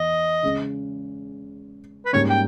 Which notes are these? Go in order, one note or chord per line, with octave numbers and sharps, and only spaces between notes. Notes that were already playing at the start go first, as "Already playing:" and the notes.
Already playing: E2 D#5
C#3 G#3 C#4
B4
G#2 G3 A#3 C#4 C#5
G5